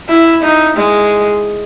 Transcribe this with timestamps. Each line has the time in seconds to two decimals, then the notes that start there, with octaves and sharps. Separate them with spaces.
0.09 E4
0.42 D#4
0.77 G#3